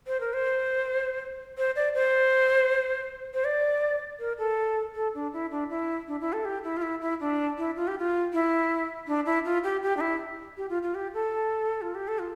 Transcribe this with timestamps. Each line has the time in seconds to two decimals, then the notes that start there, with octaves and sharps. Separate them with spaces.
0.07 C5
0.21 A#4
0.33 C5
1.58 C5
1.76 D5
1.95 C5
3.34 C5
3.45 D5
4.20 A#4
4.38 A4
4.95 A4
5.14 D4
5.33 E4
5.51 D4
5.70 E4
6.08 D4
6.21 E4
6.33 A4
6.45 G4
6.64 E4
6.77 F4
6.82 E4
7.01 E4
7.20 D4
7.58 E4
7.76 F4
7.87 G4
7.98 F4
8.33 E4
9.07 D4
9.26 E4
9.45 F4
9.64 G4
9.83 G4
9.97 D4
10.01 E4
10.57 G4
10.70 F4
10.83 F4
10.95 G4
11.14 A4
11.82 F4
11.95 G4
12.08 A4
12.19 F4